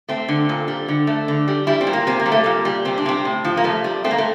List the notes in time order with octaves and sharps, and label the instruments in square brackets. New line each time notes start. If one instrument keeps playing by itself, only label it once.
[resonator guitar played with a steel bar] A3 C4
D3
A#2
G3
D3
A3
D3
G3
G3 E4
C4
A#2
A#3
C3 C4
A#3
G3
A3
A#2 A#3
G3
C3 C4
D4
C3 C4
A2
F3
A#3
C3 A3
G3
A3 C4
A#3
A3